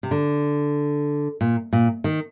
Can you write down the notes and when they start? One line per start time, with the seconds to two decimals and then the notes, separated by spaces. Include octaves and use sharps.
0.03 C3
0.11 D3
1.41 A#2
1.73 A#2
2.04 D#3